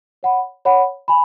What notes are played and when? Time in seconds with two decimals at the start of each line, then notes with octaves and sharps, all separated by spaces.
0.23 C#5 F#5 B5
0.65 C#5 F#5 B5
1.08 G#5 B5